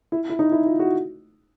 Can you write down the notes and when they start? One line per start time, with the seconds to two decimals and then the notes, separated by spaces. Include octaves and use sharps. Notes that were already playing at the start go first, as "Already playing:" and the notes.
0.12 E4
0.29 E4
0.39 D#4
0.52 E4
0.66 F4
0.79 F#4